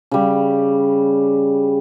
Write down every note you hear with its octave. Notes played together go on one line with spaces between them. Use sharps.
C#3 G3